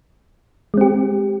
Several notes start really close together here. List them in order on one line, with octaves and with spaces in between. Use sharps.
G#3 C4 G4